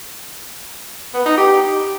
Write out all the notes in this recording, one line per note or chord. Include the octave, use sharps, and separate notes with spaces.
B3
D#4
G4